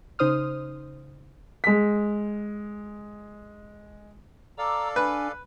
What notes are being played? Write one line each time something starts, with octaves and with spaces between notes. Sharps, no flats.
C#3 D#4 C5 D#6 F6
G#3 B6
A4 D5 F5 A#5 D6 E6
D4 B4 G#5